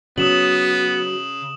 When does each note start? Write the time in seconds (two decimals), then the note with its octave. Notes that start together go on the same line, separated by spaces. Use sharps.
0.18 C#3 F#3 B3 D#6 E7 F#7